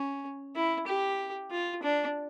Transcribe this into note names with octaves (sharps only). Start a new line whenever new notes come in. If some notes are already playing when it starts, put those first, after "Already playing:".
Already playing: C#4
E4
G4
F4
D4